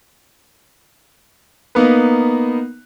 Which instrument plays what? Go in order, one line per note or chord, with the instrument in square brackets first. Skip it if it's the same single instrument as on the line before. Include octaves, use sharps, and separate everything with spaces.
[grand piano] A#3 B3 D#4 A#4 B4